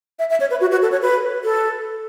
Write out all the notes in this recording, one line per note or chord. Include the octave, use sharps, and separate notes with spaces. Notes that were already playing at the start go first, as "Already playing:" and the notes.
E5
E5
C#5
B4
F#4
F#4
A4
C#5
B4
A4